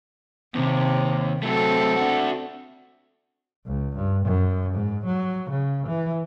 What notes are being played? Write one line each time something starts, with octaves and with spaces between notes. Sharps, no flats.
D#2 C3
F#3 A3 C4 A4
D4 F#4
C#2
G2
F#2
G#2
F#3
C#3
E3